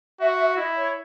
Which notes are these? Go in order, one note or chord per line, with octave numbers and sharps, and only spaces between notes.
F#4 E5
E5
E4 D#5
C#5